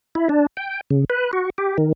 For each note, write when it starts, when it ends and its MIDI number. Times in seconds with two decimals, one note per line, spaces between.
0.15 0.28 64
0.29 0.46 62
0.57 0.81 79
0.90 1.05 49
1.10 1.31 71
1.33 1.50 66
1.58 1.77 67
1.78 1.92 51